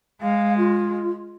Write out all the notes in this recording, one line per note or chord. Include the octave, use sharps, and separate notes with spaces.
G#3 F5
F4